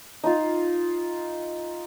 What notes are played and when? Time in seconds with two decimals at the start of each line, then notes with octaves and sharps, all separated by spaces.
0.24 D#4 F4